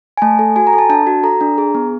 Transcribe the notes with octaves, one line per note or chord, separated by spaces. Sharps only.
G#5
A3 A5
A4
F#4 G#5
A#5
A4
A5
D4 A5
F#4
A4 A#5
D4
G#4
B3